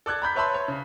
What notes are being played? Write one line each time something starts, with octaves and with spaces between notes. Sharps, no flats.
A4 D5 F#6 G#6
A#5 B5 G6 B6
B4 C#5 E5 A5 B5 C6
C#5
C#3